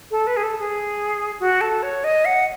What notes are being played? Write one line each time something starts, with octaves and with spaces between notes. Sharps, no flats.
A4
B4
G#4
A4
G#4
F#4
A4
C#5
D#5
F#5